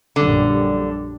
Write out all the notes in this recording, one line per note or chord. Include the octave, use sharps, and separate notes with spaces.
A#1 F#2 D3 G3